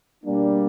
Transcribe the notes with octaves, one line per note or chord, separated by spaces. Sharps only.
B2 G3 A#3 D4